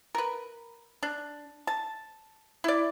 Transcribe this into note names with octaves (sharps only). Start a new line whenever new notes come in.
A#4 B4
D4
A5
E4 D5